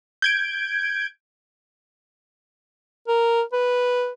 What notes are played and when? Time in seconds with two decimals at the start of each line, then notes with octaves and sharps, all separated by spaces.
0.22 G6 G#6 D7
3.08 A#4
3.53 B4